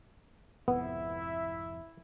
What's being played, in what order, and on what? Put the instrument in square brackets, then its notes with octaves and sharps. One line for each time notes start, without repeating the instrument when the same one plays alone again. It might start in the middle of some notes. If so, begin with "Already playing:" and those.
[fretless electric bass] G#1 F2 C3 [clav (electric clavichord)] B3 [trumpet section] E4 E5